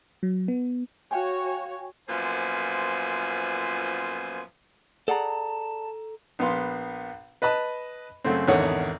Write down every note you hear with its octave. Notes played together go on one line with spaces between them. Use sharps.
F#3
B3
F#4 C#5 F5 G5 G#5
F#2 A#2 F3 B3 C5 G#5
G#4 A4 D5 F#5 A5 A#5
A#1 B3 B4 F5 C6
B4 D#5 A5 B5
F#2 C#3 A3 C4
G#1 E2 D3 D#3 C#5 F#5